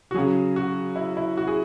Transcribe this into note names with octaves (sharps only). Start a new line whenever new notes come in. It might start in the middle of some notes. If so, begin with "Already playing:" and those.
F#4
C#3 F#3 G#4
F#4
E4
E4
F#4
G#4